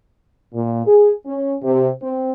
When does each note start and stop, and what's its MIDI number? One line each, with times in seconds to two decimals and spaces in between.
0.54 0.86 46
0.87 1.12 68
1.27 1.55 61
1.63 1.90 48
2.02 2.32 60